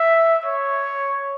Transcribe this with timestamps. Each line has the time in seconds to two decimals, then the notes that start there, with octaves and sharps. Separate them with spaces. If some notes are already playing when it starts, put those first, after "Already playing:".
Already playing: E5
0.45 C#5